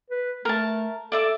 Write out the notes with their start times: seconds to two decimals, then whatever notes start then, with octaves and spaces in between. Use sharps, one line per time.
0.11 B4
0.45 A3 A#4 A5
1.12 A4 D5 E5 D6